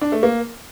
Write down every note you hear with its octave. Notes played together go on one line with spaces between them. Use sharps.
D4
A3
A#3